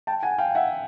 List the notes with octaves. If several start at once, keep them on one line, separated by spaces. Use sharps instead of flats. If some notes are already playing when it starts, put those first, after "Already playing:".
G5 A5
F#5 G#5
F5 G5
E5 F#5